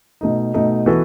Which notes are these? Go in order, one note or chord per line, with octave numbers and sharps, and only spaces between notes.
B2 A3 D#4
B2 A3 D#4
E3 B3 F#4 A4